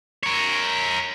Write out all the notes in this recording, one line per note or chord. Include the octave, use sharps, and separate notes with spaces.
A#4 C#5